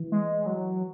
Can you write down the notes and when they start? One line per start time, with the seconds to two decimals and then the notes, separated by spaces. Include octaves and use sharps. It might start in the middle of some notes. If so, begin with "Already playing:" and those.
Already playing: E3
0.12 G#3
0.46 F#3